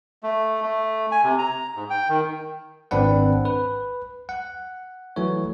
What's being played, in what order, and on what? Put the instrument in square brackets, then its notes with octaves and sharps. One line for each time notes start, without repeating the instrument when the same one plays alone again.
[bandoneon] A3
A3
G#5
C3
A#5
G#2
G5
D#3
[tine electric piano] G#1 C4 D4 B4 F#5
B4
F#5
E3 F#3 A3 C#5